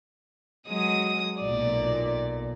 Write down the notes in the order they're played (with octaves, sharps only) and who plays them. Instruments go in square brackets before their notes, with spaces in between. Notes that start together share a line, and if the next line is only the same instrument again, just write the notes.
[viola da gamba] F#3 G#3 [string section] D#6
[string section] B1 A#2 [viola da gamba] D5